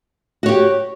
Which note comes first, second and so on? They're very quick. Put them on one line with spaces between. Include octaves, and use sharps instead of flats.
F#4 C#5 G4